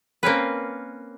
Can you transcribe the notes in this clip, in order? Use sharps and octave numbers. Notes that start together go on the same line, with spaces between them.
A#3 C4 C#4 B4